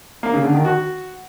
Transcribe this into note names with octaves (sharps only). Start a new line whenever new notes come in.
A#3
C#3
D3
D#3
F#4